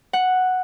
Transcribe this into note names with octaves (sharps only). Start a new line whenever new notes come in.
F#5